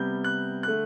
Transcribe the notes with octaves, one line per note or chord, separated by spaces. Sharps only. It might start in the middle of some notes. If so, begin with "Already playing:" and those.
Already playing: C3 G3 B3 G6
F#6
D3 A3 F#6